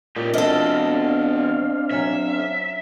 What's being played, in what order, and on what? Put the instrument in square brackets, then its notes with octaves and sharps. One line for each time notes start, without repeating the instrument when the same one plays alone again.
[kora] A#2 [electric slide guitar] C#4 D#4 G4
[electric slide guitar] E2 B2 [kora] A3 [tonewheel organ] C4 D4 F5 [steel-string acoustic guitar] A4 D#5
[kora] F#3 C#4 C#5 [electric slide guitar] E5